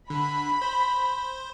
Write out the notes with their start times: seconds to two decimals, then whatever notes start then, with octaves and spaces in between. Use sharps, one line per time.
0.10 D3 B5
0.62 C5